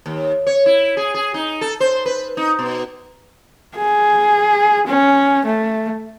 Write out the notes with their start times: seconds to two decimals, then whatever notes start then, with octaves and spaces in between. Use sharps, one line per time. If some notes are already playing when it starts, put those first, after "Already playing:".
0.06 D#2
0.47 C#5
0.66 E4
0.97 G#4
1.14 G#4
1.34 D#4
1.61 A4
1.80 C5
2.06 B4
2.37 D#4
2.59 B2
3.75 G#4
4.87 C#4
5.45 A3